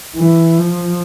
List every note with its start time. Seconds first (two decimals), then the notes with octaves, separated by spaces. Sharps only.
0.16 E3
0.59 F3